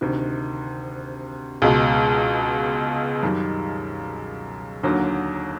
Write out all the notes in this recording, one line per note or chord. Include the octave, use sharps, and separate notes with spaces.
D2 C3 D#3
C#2 B2 G#3
F#2 D#3 G3
D#2 D3 F#3 A#3